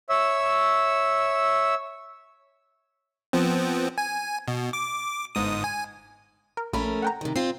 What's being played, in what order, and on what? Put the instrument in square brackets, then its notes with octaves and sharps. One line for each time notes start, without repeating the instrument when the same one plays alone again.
[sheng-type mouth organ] C#5 E5 E6
[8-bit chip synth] F3 B3 C4
G#5
B2
D6
G1 G#2 D#6
G#5
[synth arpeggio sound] A#4
[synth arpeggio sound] A#1 B5 [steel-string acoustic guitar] A3 C#4 A#4
[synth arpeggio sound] F#5 G5 A#5
[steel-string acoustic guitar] C3 D#3
[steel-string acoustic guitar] C4 F4 [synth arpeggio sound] C7